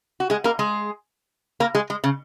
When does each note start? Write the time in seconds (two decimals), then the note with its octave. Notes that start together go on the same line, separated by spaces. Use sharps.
0.20 F#4
0.30 G#3 G#4
0.44 A#3 A#4
0.59 G#3 G#4
1.60 A#3 A#4
1.75 G#3 G#4
1.90 G#3
2.04 C#3